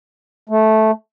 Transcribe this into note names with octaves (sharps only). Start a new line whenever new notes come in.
A3